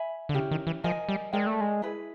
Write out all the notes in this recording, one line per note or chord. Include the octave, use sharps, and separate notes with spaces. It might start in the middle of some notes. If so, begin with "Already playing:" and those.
Already playing: E5 G#5 B5
D3
C#3 C#4 E4 G4
D#3
E3
F3 A#4 D#5 G#5
G3
G#3 A#4 D5 G5
A3
G#3
E4 G#4 B4